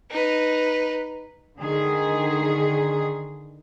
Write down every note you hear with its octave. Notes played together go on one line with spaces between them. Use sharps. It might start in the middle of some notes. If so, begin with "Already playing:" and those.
D#4 B4
D3 D#3 G#4